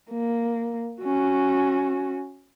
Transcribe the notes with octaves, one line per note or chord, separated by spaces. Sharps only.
A#3
C#4 F#4